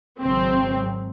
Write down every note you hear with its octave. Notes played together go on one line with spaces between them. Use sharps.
G#1 F#2 C#3 F#3 C4